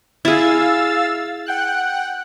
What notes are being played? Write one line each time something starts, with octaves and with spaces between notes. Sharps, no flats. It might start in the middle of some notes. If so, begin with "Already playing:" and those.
E4 G#4 F5 E6 A6
F#5 G5 F#6